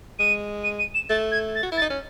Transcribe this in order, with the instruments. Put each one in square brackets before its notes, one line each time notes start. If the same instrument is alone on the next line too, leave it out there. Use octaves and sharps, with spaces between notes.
[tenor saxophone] G#3 [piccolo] D#7
[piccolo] D#7
D#7
E7
[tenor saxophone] A3 [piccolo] A6
[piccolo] G#6
A6
[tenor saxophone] F#4
E4
[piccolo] A6
[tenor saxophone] D#4
C#4